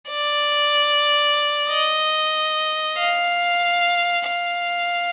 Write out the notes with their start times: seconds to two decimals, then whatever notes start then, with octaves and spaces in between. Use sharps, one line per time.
0.10 D5
1.70 D#5
2.98 F5
4.28 F5